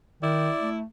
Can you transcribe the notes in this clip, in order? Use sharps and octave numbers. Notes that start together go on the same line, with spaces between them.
D#3 E4 D5
A3